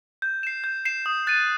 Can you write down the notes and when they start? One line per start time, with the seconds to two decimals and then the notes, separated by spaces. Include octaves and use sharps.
0.22 G6
0.43 C7 E7
0.64 G6
0.85 C7 E7
1.06 D#6
1.27 F#6 A6 D#7